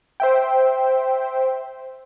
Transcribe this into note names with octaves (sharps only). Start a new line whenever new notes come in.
C5 E5 G5